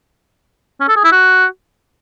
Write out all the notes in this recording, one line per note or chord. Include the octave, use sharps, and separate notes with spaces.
C#4
A4
G#4
E4
F#4